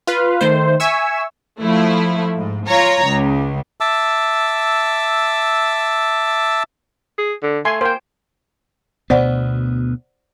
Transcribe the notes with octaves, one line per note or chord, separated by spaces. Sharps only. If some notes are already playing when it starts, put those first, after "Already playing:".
F4 B4 F5
D#3 A3 C5
E5 G#5 C#6 E6
F3 A3 E4
G#2
F4 C#5 A#5
C#2
E5 A5 D6 E6
G#4
D3
A3 G#5 C6
A#3 C5 G5
D2 B2 B3 C5 D5 F#5